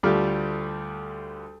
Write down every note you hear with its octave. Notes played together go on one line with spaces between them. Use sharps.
D2 G3 A3 F4 G4 F6